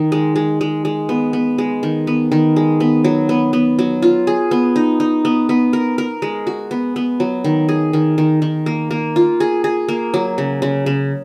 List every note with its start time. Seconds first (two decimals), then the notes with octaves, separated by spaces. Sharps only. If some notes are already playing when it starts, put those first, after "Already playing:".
Already playing: D#3
0.12 G#3
0.36 G#3
0.61 G#3
0.85 G#3
1.09 B3
1.33 B3
1.58 G#3
1.83 D#3
2.07 B3
2.32 D#3
2.56 G#3
2.80 B3
3.04 F#3
3.29 B3
3.53 B3
3.79 F#3
4.02 F4
4.27 G#4
4.51 B3
4.76 D#4
5.00 D#4
5.25 B3
5.49 B3
5.73 A#4
5.98 A#4
6.22 G#3
6.47 F#4
6.71 B3
6.96 B3
7.20 F#3
7.44 D#3
7.69 G#4
7.93 D#3
8.18 D#3
8.42 D#3
8.66 A#3
8.91 A#3
9.16 F4
9.40 G#4
9.64 G#4
9.88 A#3
10.14 F#3
10.38 C#3
10.62 C#3
10.86 C#3